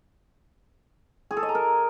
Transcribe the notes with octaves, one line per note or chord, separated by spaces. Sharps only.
G#4
A4
D#5
A#5
A#4